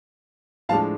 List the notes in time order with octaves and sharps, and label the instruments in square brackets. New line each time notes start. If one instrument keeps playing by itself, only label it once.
[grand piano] A2 F3 G#3 D4 F5 A5